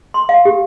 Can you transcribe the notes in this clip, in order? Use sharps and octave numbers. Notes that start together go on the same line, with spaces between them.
C6
F5
G4